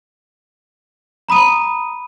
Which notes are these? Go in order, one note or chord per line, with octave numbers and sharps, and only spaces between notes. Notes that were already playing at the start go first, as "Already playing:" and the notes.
A#5 B5 D#6 D#7